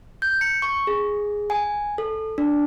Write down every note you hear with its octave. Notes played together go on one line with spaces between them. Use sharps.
G6
C#7
C#6
G#4
G#5
A4
D4